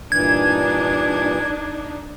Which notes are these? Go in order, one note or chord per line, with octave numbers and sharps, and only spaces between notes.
G2 A#2 E3 D4 D#4 G#6